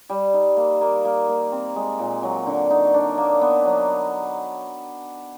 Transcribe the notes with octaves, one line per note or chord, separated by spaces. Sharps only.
G3
D#4
A#3
A#3
A#3
A#3
C4
G#3
A#2
F#3
D3
D#4
D4
A#3
B3
F#3